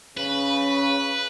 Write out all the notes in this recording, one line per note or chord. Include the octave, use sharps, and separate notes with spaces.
C#3 B4